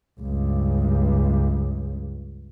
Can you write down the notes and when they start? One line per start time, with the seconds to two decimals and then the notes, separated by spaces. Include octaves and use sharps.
0.20 C#2 G2